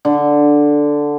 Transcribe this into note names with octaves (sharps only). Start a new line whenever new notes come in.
D3